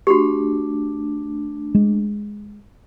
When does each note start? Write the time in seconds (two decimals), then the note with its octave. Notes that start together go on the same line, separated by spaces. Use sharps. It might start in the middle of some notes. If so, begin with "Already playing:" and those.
0.07 A3 D4 F#4 G4
1.75 G#3